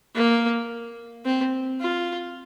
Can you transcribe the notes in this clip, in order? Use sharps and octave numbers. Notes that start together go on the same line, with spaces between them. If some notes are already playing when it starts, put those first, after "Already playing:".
A#3
C4
F4